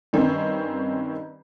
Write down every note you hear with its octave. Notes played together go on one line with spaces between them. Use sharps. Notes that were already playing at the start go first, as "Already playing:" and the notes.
G2 D#3 C4 C#4